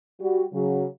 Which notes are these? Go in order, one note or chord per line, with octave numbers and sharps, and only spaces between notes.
G3 F#4
C#3 F#3